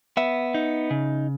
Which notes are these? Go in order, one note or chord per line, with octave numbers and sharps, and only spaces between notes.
B3 E5
D#4
C#3